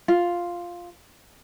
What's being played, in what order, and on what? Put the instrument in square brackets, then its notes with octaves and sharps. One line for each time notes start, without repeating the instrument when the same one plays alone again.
[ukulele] F4